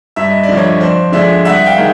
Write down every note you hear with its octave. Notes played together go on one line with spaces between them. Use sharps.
G2 E5
D#5
D5
D3 F3
C#5 D#5
F2 C5 D5
D3 F3 G#3 D5 E5
C2 E5 F#5
F5 G5
D#3 G#3